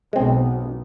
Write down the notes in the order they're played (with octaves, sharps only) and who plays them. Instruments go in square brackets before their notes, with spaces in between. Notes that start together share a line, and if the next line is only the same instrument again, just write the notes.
[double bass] B1 B2 [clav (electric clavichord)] G#3 C4